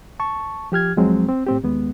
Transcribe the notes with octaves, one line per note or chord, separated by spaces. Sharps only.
A5 C#6
F3 G4 F6 G#6
E2 F3 F#3 G#3 C4
C4
A2 C4 G4
D#2 G#3 B3